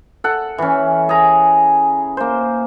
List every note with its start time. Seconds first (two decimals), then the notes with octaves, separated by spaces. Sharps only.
0.24 A4 F#5
0.58 E3 C#4
1.09 G#4 A#5
2.17 A#3 C5